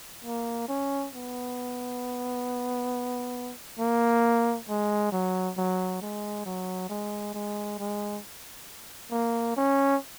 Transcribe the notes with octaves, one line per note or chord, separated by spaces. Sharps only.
A#3
C#4
B3
A#3
G#3
F#3
F#3
G#3
F#3
G#3
G#3
G#3
A#3
C#4